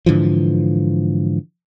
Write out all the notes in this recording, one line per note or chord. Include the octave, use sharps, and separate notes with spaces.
G#2 D3 E3 F3